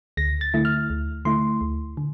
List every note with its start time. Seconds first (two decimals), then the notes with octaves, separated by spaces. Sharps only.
0.17 D2 A#6
0.41 A6
0.54 D3 A3 E4
0.65 F6
0.90 D2
1.25 D3 A3 E4 C6
1.61 D2
1.97 D3